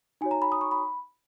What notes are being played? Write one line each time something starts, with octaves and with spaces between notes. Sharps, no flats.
D#4 F#4 C#5 G#5
A#5
B5
D#6
C#6
B5